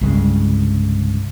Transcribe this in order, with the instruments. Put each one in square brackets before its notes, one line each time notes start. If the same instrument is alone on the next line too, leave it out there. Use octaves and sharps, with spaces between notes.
[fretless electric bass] C2 G2 C#3 G#3